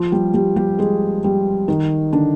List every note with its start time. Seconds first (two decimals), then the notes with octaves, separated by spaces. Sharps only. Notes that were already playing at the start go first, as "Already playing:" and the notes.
Already playing: F3 F4
0.12 G3 G4
0.34 G3 G4
0.56 G3 G4
0.79 G#3 G#4
1.24 G3 G4
1.68 D#3 D#4
2.13 D3 D4